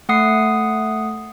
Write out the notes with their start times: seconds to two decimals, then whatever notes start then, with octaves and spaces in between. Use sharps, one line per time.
0.09 A3 F#5 D#6 C7